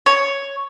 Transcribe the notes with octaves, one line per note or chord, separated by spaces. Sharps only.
C#5